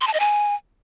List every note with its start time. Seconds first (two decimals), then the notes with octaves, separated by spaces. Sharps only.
0.01 C6
0.07 A5
0.14 D#5
0.20 G#5